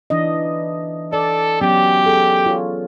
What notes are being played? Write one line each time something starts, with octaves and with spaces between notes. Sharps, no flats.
E3 D4 D#5
A4 D5
F#3 B3 C#4 G4
G#4 A4
F4 C#5